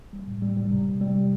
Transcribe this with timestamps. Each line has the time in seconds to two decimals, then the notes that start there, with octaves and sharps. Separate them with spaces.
0.13 G3
0.27 A2
0.42 G3
0.57 G3
0.72 C3
0.86 C3
1.01 G3